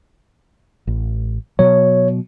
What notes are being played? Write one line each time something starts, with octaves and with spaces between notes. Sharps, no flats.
A1
B2 F#3 C#5